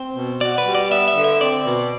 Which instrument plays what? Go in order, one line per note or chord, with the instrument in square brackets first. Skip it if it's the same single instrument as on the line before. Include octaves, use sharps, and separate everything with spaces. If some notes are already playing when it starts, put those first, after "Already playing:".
Already playing: [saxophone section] C4 [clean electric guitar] C5
[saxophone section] B2
[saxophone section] F#4 [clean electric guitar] D5
[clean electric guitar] B4
[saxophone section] G3
[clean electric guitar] D5
[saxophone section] B3 [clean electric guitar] E5
[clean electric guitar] E5
[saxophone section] D3
[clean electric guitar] E5
[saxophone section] C4 [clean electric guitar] D5
[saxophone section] B2